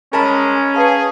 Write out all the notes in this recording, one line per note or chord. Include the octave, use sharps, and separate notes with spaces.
G#3 C#4 A#4 A5 B5
G#4 B4 F5 A5